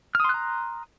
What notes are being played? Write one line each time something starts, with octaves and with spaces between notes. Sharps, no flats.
A#5 C6 D#6 F6 F#6